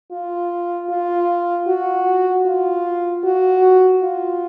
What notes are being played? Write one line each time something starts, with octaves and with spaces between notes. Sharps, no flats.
F4
F4
F#4
F4
F#4
F4